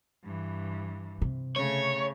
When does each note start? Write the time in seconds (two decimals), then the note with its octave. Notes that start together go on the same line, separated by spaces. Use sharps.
0.24 G2 E3
1.22 C3
1.56 C#3 A3 C#5